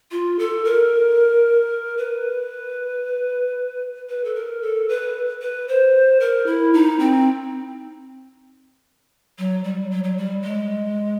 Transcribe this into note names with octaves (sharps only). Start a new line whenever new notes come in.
F4
A4
A#4
B4
B4
A4
A#4
A4
B4
B4
C5
A#4
E4
D#4
C4
F#3
G3
F#3
F#3
G3
G#3